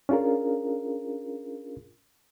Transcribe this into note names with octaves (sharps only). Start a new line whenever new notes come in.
C#4 D4 F4 G#4 A#4